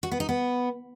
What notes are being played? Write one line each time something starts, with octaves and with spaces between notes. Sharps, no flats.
F#4
B3
D#4
B3